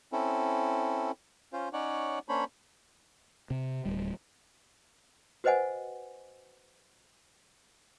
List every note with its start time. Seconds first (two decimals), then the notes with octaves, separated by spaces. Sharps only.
0.12 C4 C#4 E4 A4
1.53 C#4 F4 C5
1.73 C#4 D#4 C#5 D5 F#5
2.29 A#3 C#4 D4 C5 C#5 B5
3.50 C3
3.85 D1 G3
5.44 F#4 B4 C5 D#5 F#5 G#5